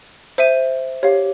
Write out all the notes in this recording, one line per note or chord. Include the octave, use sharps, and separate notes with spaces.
C5 E5 D#7
G4 C#5 F5